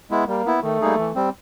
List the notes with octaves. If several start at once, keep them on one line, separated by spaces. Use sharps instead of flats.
G#3 B3 E4
G3 A#3
B3 E4
D#3 A3
G3 A#3 D#4 G#4
E3
G3 C4